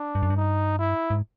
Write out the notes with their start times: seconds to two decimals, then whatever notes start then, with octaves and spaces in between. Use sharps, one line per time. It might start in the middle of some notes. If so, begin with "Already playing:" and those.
Already playing: D4
0.15 G2
0.23 F#2
0.30 G2
0.36 D#4
0.79 E4
1.10 G#2